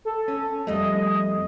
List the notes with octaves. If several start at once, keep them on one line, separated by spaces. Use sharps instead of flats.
A4
C#4
F2 G3 A3 D#5